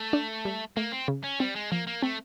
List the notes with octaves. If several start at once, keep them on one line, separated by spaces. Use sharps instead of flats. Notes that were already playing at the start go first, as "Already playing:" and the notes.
Already playing: A3
D4
G3
A3 A#3
C4
C#3
C#4
G3 C4
G#3
F3 A#3
A#3
A3 C4